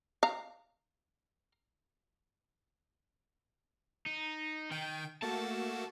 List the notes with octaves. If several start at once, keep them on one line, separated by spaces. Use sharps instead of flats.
F5 A#5
D#4
D#3 G5
A3 A#3 F#4 A5